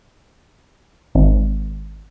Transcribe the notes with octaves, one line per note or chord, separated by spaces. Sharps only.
G#1